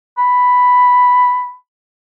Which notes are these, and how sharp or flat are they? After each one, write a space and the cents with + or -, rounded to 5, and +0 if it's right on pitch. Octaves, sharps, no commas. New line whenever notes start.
B5 +5